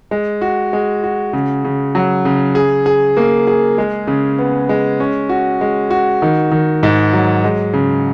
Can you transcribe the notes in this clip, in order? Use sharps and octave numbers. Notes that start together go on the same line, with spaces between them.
G#3
F#4
G#3
F#4
C#3
C#3
F#3
C#3
G#4
G#4
A#3
G#4
G#3
C#3
B3
G#3
C#4
F#4
G#3
F#4
D#3
D#3
G#2
F#3
G#3
C#3